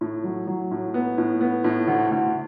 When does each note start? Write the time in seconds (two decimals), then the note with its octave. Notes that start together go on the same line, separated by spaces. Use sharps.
0.01 A2
0.24 F#3
0.47 F#3
0.71 A2
0.94 B3
1.18 A2
1.41 B3
1.64 A2
1.87 D2
2.11 D2